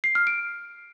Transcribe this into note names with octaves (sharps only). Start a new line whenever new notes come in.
C7
F6
D7